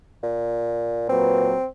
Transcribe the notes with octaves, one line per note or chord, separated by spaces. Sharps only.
A#2
A#2 F#3 C4 B4